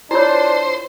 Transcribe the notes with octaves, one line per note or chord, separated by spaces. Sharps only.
D4 E4 F4 C5 C#5